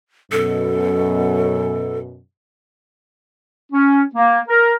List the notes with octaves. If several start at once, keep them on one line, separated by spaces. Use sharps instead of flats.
F#2 B2 A4
C#4
A#3
A#4